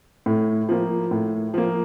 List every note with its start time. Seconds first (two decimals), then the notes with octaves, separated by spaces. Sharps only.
0.26 A2
0.69 F3 A#3
1.11 A2
1.54 F3 A#3